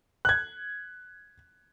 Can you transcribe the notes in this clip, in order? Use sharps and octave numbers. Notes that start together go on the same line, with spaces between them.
F#6 G#6